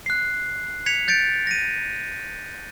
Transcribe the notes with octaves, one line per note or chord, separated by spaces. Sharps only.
F#6 C7
G#6 B6 C#7 F7
G6 A6 C#7 D7
A#6 D#7